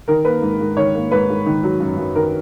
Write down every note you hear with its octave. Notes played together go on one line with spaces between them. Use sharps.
D#3 A#4
A#3 B4
G#2
G#2
D#3 C#5
A#3
G#2 B4
G#2
D#3
F#3
F#2
F#2
D#3 A#4